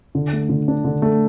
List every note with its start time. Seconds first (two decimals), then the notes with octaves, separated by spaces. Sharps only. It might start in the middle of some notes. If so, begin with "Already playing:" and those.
0.15 D3
0.33 A3
0.49 D3
0.68 D4
0.84 D3
1.02 A3